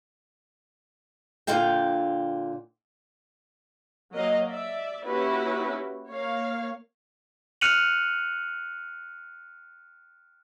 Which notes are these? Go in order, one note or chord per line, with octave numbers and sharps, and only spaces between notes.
A#2 D3 F4 F5 G5
F#3 A#3 A#4 D#5 F5
D5 E5
A#3 C#4 E4 F#4 G4 B4
A#3 C#5 F5
F6 F#6 C#7 D#7 F7 F#7